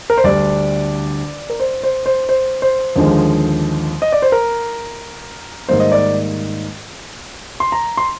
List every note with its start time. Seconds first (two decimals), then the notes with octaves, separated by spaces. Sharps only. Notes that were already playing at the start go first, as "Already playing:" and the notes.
0.10 A#4
0.18 C5
0.24 D2 D3 G3 D4 D5
1.50 A#4
1.60 C5
1.83 C5
2.06 C5
2.29 C5
2.62 C5
2.96 D#2 D3 F3 G#3
4.02 D#5
4.12 D5
4.22 C5
4.32 A#4
5.69 G#2 D#3 G3 A#3 C5
5.80 D#5
5.92 D5
7.60 C6
7.72 A#5
7.97 C6